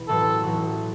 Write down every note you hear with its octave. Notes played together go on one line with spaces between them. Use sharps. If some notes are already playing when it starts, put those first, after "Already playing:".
Already playing: E1 E4
A1 A2 F#3 C4 F#4 A4
A1 A2 F#3 C4 F#4